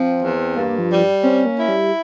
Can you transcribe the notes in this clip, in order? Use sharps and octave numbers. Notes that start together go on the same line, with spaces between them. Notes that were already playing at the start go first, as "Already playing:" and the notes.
Already playing: F3 C4
E2
G2 A#3
F3
G3
C4 C#4
A#3
E4
G3